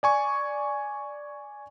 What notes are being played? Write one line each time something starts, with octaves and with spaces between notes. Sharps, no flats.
D5 G#5 C#6